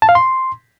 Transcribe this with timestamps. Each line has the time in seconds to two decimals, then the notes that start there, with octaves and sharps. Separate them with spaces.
0.02 A5
0.09 F5
0.15 C6